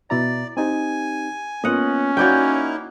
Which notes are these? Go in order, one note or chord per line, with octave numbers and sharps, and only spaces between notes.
B2 E4 D5 A#5
C4 D#4 G4 G#5
A#3 B3 C#4 F4 D#5 F#5
A#3 D#4 E4 F#4 C#5 D5 G5 G#5